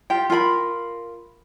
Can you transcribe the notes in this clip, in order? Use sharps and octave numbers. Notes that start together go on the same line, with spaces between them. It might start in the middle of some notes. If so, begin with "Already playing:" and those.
F4 G4 G5
F4 A#4 G5 B5